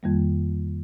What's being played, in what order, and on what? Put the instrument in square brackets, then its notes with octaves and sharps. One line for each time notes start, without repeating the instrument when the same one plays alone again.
[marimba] F2 D#3 G3 A#3